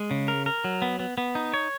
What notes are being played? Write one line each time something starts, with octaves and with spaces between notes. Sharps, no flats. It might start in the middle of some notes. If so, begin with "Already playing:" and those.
Already playing: G#3
C#3
A#4
A#4
F#3
B3
B3
B3
D#4
C#5